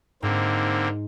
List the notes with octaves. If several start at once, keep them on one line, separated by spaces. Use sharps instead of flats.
G#2 D3 A#3 C4